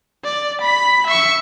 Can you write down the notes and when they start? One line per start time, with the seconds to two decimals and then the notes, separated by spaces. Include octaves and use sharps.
0.24 D5
0.61 B5 B6
1.07 E5 C#6